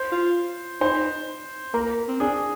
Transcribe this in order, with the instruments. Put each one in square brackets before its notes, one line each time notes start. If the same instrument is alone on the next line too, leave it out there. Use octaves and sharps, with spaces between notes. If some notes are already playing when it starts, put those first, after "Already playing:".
Already playing: [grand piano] C5
[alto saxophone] F4
[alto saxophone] D#4 [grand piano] C5
[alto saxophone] A#3 [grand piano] A#4
[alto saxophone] C4
[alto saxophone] D4 [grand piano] G#4